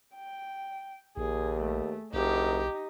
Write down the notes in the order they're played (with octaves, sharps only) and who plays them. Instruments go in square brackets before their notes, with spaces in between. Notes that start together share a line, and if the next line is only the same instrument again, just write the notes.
[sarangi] G5
[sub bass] A#1 [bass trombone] D#2 [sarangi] G#4
[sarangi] A3
[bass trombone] F#1 [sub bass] B1 [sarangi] D#4 [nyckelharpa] G4